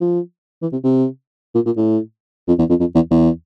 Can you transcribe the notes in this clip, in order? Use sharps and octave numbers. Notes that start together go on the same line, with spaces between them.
F3
E3
C3
C3
A#2
A#2
A2
F2
E2
F2
F2
E2
E2